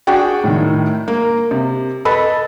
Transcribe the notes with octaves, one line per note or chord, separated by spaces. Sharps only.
D4 F#4 G#4 G5
A2 D#3
A#3
C3
A4 B4 D#5 B5